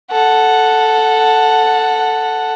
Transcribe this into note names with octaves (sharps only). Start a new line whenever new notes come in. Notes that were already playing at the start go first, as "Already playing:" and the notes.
A4 F#5